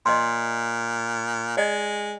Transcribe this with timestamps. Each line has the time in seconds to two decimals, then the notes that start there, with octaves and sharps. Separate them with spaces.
0.06 A#2 D#5 C6
1.57 G#3 D5 D#5